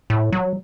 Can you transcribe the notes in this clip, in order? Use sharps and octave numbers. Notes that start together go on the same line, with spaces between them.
A2
F#3